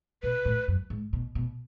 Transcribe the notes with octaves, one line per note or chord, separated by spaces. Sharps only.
B2 B4
A2
F#2
G#2
B2
B2